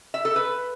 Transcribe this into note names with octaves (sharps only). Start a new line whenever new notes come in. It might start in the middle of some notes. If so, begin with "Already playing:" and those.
E5
A4
B4